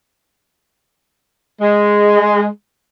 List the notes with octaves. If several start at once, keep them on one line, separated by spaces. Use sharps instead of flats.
G#3